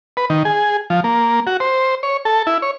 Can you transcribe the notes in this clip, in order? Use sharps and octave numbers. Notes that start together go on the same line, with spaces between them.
B4
D#3
G#4
F3
A#3
F#4
C5
C#5
A4
E4
C#5